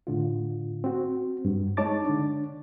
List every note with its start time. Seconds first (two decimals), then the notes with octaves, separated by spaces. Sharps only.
0.07 A2 D3 F4
0.84 C4 F#4
1.45 G2
1.77 G#3 D#4 C#5 A5 D6 A6
2.05 D3 D4